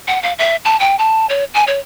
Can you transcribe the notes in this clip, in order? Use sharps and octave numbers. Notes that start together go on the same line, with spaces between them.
F#5
F5
E5
A5
G5
A5
C#5
G#5
C#5